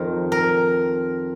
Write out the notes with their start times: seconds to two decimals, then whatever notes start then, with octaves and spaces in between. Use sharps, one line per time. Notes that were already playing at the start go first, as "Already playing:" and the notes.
Already playing: F2 D#3 A#4
0.32 A#4